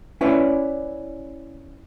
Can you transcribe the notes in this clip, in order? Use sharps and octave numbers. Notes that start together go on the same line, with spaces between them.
C#4 E4 B4 C#5 D5